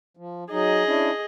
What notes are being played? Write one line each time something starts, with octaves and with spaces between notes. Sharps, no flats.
F3
F#3 D#4 G#4 D#5
C#4 D4 E4